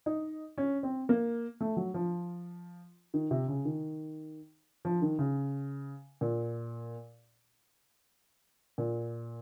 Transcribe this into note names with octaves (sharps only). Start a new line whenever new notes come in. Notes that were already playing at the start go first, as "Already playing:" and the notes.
D#4
C#4
C4
A#3
A3
F#3
F3
D#3
C3
C#3
D#3
F3
D#3
C#3
A#2
A#2